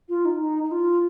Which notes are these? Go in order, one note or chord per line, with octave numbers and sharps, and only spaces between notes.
F4
D#4
D#4
D#4
F4